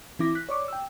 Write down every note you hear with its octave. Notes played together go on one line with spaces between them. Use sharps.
E3 C4 E4 D6 A#6
F#6 B6
C#5 D5 C#6 D6
G5 E6